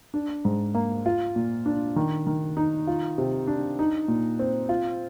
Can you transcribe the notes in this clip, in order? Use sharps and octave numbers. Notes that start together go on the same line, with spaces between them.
D4
G#2
A#3
F4
A#2
D4
D#3
D#3
D#4
F4
C3
D4
D#4
A#2
C4
F4